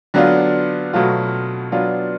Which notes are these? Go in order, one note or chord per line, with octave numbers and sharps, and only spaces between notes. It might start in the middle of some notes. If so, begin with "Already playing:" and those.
D3 F#3 B3 D4 F4
B2 F#3 A3 F4
F#3 B3 D4 F4